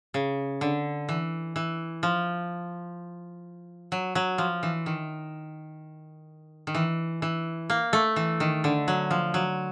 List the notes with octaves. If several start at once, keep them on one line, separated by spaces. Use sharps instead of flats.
C#3
D3
E3
E3
F3
F#3
F#3
F3
E3
D#3
D#3
E3
E3
A#3
A3
E3
D#3
D3
F#3
F3
F#3